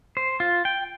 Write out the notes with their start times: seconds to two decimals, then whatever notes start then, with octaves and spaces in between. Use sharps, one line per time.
0.17 C5
0.40 F4
0.65 G5